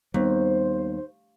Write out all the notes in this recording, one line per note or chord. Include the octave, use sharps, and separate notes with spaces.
D#2 G3 B3 C4 C5